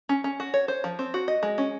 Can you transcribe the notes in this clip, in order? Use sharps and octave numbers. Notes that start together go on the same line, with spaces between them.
C#4
C#4
F#4
C#5
C5
F3
C4
F#4
D#5
G#3
C#4